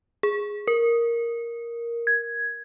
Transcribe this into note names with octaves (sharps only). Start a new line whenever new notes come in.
G#4
A#4
G#6